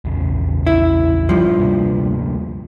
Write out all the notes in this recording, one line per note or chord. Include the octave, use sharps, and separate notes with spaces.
A#1 E2 C#3
E4
G2 F3
D2 C3 A#3